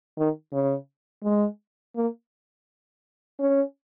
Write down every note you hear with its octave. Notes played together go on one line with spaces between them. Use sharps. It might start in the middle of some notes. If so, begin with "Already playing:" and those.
D#3
C#3
G#3
A#3
C#4